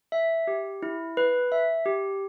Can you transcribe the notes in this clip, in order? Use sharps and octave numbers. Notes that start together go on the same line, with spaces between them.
E5
G4
E4
B4
E5
G4